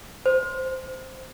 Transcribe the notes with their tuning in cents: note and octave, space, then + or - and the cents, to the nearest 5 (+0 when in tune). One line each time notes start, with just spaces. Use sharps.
C5 -5